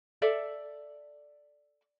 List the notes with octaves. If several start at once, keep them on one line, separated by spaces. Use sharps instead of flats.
A4 D5 E5